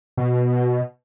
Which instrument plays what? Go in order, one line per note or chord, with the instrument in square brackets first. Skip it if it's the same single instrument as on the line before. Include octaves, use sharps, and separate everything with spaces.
[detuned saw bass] B2